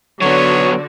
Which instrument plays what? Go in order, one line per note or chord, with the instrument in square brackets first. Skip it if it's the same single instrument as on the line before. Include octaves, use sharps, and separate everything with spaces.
[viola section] D3 F#4 [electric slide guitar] F#3 B3 [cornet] C#5